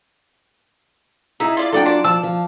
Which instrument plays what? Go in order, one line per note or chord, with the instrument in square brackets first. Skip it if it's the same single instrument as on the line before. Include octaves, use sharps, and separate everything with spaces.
[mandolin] D#4 E5 [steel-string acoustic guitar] E4 G#4
[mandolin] F4 D5
[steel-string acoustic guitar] F#3 D4 F4 [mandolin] A4 D5 G5
[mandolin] D5 A5 C6
[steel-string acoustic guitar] F3 [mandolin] A5 D6 E6
[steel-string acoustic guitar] F3